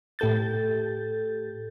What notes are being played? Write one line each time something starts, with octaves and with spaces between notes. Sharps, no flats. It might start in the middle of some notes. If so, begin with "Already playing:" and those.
A2 G4 A4 G6 A6